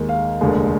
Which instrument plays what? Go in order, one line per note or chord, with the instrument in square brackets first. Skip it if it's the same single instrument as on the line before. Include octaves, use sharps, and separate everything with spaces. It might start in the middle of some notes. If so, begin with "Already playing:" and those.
Already playing: [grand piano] D#2 D#3 G#3
F5
F1 D#2 D3 G#3